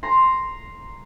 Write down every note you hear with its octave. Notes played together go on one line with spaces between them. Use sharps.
A#5 C6